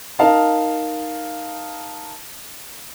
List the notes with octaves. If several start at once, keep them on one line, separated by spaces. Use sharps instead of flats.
D#4 A#4 F5 A5